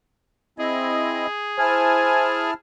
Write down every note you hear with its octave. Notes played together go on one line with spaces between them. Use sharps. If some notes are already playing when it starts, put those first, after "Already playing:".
C4 E4 G#4 D#5
E4 C5 G#5 A5 F6